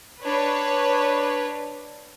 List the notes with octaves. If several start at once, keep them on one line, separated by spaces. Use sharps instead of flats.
D4 B4 C#5